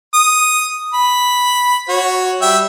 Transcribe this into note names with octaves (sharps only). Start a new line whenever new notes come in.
D#6
B5
F#4 C#5
G3 E5 G5